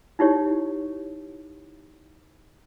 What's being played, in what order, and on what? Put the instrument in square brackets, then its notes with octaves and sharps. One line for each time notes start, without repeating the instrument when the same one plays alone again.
[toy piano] D#4 E4 G4 C#5